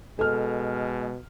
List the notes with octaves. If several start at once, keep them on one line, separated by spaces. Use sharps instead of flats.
B2 G#3 A4 F6